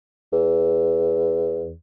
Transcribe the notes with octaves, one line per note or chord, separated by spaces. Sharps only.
E2